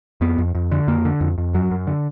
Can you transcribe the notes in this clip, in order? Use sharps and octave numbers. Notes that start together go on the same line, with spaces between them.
F2 B3
F2
F2
D3
F2 A#3
D3
F2
F2
F#2 F#3
F#2
D3